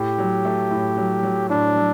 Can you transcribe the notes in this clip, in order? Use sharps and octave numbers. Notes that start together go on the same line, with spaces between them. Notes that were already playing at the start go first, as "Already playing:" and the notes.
Already playing: A2 G4
F#3
A3
A2
F#3
F#3
A2 D4
F#3